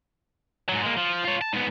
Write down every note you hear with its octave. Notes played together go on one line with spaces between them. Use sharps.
G#2 F#3
G#3 A#3
F3
F4 C#5
A5
G#2 B3